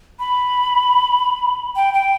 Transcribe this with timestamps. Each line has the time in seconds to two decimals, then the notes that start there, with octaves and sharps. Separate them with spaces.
0.19 B5
1.76 G5
1.94 G5